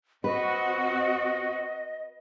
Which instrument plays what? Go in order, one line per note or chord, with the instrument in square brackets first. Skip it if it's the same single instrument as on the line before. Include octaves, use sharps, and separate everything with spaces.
[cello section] C4 F#4 [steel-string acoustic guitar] B4 [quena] D#5